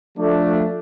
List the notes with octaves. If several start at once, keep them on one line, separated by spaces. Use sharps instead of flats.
F3 A3 D4